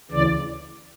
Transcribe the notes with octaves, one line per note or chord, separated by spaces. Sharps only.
D2 C#3 E3 D5